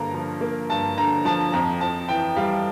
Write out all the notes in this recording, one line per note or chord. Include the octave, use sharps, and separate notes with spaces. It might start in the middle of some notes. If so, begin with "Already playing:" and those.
Already playing: G2 D3 A#3 A#5
F3
A#3
G2 A5
D3 A#5
F3 A5
F2 A#5
F2 A5
E3 G5
G3 F5